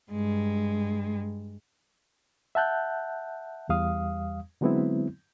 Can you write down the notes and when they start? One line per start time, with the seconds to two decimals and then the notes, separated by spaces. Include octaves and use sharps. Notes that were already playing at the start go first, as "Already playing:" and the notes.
0.12 G2 G#3
2.55 E5 F#5 A5 F#6 G6
3.69 E2 G3 F5 D#6
4.61 D3 F#3 G#3 B3 C4 E4